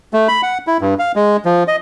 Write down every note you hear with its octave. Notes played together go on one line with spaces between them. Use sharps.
A3
B5
F#5
E4
G2
F5
G#3
F3
D#5